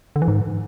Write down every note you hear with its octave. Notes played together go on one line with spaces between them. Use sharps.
D3
E3
G#2